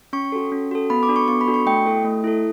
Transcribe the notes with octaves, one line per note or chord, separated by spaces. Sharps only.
C#4 C#6
F#4 A4
C#4
F#4 A4
B3 B5
D6
D4 F#4 A4
C#6
B3 C#6
B5
D4 F#4 A4
C#6
A3 G5
E4 A4
A3
E4 A4